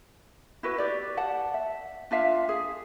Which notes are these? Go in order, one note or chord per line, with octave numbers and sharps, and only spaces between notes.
E4 F#4 B4
G4 D5
F#5 A5
E5
D4 F4 E5 F5
G#4